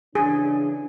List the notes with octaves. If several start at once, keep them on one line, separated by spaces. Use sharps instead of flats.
C#3 E3 D4 G#4